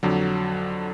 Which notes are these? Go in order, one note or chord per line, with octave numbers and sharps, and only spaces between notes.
F2 D3 F#3